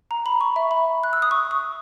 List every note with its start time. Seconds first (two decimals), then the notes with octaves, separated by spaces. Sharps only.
0.11 A#5
0.26 B5
0.41 C#6
0.56 E5
0.71 B5
1.04 F#6
1.13 E6
1.22 D#6
1.31 C#6
1.51 D#6